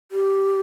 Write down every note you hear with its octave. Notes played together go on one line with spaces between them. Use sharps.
G4